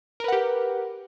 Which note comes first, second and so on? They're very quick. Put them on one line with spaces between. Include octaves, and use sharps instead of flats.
A#4 B4 F#5 G4